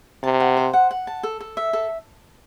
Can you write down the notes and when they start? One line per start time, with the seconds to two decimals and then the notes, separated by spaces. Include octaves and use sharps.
0.23 C3 A5
0.40 F#5
0.57 C5
0.73 F#5
0.91 F#5
1.07 A5
1.23 A4
1.40 A4
1.57 E5
1.73 A4